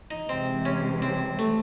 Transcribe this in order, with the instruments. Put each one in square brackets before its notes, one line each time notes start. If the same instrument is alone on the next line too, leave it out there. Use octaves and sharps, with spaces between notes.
[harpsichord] D#4
[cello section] C3 E3 G#3 [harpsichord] C4
[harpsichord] C#4
C4
A3